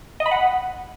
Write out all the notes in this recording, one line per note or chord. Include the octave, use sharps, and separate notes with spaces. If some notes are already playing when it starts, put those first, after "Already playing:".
D#5
B5
F#5